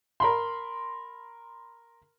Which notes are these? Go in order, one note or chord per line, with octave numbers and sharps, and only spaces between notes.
A#4 B5 C6